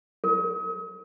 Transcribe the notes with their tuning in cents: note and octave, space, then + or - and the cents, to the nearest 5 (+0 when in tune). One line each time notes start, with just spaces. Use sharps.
A#4 -45